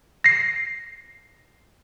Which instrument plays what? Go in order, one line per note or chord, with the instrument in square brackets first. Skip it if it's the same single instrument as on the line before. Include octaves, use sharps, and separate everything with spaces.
[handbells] A#6 C7